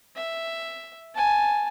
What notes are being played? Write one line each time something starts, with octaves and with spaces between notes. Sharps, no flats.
E5
G#5 A5